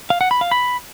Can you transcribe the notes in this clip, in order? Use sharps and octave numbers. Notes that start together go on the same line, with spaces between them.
F5
F#5
B5
F5
B5